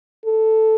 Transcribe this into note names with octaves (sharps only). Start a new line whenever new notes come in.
A4